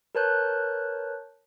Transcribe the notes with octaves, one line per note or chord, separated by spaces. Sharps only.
A#4 B4 C#5 A5 F#6 G6